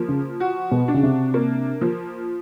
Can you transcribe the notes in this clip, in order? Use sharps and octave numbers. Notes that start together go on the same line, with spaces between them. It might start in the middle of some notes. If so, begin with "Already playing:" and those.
Already playing: F3 A#3
C#3
F#4
B2
D4
C#3
C3
A#3
F3